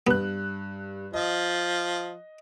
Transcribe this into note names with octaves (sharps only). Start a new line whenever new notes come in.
G2 B3 F#6
F3 D#5